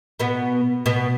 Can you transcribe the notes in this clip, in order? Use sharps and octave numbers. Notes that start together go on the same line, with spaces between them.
B2 B3
B2 B3